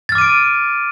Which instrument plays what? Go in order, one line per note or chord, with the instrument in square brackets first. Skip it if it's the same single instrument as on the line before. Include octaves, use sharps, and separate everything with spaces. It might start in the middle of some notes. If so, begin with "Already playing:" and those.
[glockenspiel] A6
F6
D6
D#7
D7